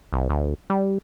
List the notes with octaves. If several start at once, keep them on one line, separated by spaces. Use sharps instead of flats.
C2
D2
G3